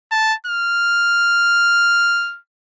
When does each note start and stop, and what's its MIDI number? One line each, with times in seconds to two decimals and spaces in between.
0.11 0.34 81
0.46 2.38 89